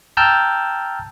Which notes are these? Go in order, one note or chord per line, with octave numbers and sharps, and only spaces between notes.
G5 A5 A#5 E6 F6 G6